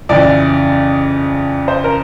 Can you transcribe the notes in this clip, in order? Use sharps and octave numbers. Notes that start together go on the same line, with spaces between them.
F2 C#3 E3 D5
C5
A#4